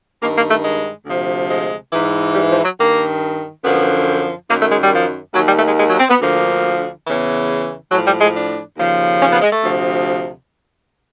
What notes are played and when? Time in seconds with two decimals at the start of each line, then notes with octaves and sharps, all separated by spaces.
0.21 G2 A#3
0.24 D#3
0.35 A#3
0.50 A3
0.64 G#3
1.06 D2 C3 F3
1.49 G#3
1.92 G#2 E3
2.35 G3
2.49 F3
2.63 F#3
2.77 G2 D#3 A#3
3.63 F#2 D3 F3 B3
4.49 F#2 D#3 A#3
4.59 A3
4.70 G#3
4.81 G3
4.92 F3
5.34 D#2 D#3 F#3
5.45 G3
5.56 A3
5.67 G#3
5.78 G#3
5.88 F#3
5.98 C4
6.10 B3
6.20 D2 D3 F3 A#3
7.05 E2 C#3 E3
7.91 A2 F3 F#3
8.05 G3
8.20 G#3
8.34 D4
8.77 D#2 C#3 F3
9.20 C#4
9.30 B3
9.41 G#3
9.52 A3
9.62 D2 C3 F3